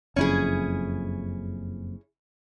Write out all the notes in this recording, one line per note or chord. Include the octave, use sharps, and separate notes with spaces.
F#1 F2 C#4 E4 G#4